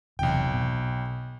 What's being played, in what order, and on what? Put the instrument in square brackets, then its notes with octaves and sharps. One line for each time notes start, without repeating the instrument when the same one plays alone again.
[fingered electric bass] E1 C3 E3 [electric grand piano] B1 G5
[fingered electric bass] B2